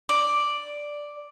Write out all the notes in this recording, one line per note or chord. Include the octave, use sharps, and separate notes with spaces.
D5